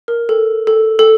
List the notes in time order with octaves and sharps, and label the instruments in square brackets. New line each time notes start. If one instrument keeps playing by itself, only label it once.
[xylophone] A#4
A4
A4
A4